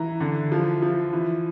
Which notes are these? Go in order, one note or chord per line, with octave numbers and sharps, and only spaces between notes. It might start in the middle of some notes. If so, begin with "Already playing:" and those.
Already playing: E3 A#5
D3
F3
F3
E3